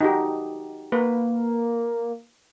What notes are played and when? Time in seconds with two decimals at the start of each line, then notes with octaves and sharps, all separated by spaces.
0.01 D#4 F#4 G4
0.92 A#3 B4